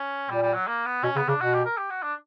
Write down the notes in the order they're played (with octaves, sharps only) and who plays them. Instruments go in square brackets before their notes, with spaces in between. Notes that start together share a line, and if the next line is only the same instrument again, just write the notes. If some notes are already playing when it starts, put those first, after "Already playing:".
Already playing: [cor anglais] C#4
[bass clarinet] A#2 [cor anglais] G3
[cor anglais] G3
F#3
A#3
B3
[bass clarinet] B2 [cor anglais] C#4
[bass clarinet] C#3 [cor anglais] B3
[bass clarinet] C#3 [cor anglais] D4
[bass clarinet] B2 [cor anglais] F#4
[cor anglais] G4
A#4
G4
F#4
D4